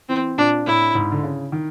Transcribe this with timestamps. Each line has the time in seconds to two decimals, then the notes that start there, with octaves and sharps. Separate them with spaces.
0.09 E3 C4
0.38 A#2 D4
0.66 A2 E4
0.95 G#2
1.12 D3
1.24 C#3
1.52 D#3